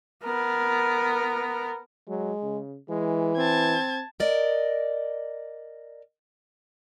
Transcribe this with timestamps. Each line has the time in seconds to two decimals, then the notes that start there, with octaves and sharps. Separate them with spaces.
0.24 B3 A#4
2.08 F#3 G#3
2.42 C#3
2.89 E3 G#3
3.37 C4 A5 G#6
4.20 A#4 D5 D#5